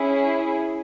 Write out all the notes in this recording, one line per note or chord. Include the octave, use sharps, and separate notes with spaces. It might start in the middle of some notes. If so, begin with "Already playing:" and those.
Already playing: C#4 E4 G#4